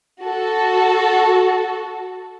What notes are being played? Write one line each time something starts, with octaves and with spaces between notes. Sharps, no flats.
F#4 A4